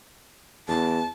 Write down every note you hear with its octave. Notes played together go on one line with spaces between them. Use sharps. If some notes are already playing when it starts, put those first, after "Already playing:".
E2 A5